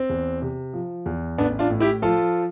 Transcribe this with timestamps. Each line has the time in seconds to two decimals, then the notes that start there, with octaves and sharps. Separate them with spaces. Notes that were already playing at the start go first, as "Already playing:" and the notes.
Already playing: C4
0.10 E2
0.42 C3
0.74 F3
1.06 E2
1.38 A1 B3 D4
1.59 D4 F4
1.70 A2
1.80 E4 G4
2.02 F3 F4 A4